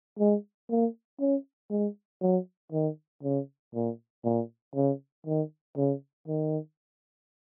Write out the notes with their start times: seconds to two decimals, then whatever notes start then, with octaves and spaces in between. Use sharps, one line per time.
0.19 G#3
0.70 A#3
1.20 C#4
1.71 G#3
2.22 F#3
2.72 D#3
3.23 C#3
3.74 A#2
4.25 A#2
4.75 C#3
5.26 D#3
5.77 C#3
6.27 D#3